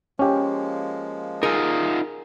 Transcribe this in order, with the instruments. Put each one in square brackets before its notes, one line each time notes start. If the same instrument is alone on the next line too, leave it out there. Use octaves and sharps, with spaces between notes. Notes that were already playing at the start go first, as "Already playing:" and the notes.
[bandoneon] F3 G#3 A#3 [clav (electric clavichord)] C#4 G4
[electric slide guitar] D#4 F4 [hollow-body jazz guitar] G#4 A#4